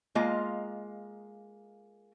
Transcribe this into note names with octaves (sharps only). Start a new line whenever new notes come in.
G#3 A#3 F4 D#5 F5